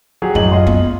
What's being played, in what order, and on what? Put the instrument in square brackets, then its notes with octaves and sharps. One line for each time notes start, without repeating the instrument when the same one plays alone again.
[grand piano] F#3 G4 G#4
[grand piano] A1 D#5 F#7 [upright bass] F#2
[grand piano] F4 D#5 C6
[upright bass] B3